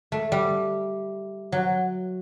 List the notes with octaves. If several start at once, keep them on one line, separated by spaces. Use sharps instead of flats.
A3
G3
F#3